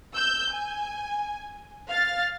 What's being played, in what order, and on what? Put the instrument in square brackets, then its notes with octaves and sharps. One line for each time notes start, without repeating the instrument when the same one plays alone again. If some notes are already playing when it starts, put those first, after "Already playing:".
[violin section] E6 G6
G#5
F5 F6 A6